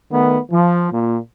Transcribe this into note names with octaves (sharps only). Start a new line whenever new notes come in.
D#3 A3 B3
F3
A#2